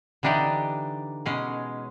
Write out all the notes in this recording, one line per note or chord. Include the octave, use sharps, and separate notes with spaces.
D3 E3 D4 D#4 G4
B2 G#3 C#4